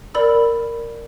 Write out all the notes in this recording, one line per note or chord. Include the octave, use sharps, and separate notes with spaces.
A#4 D5 B5 E6